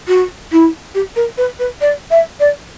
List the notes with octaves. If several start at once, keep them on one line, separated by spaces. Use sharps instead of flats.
F#4
E4
G4
A#4
B4
B4
D5
E5
D5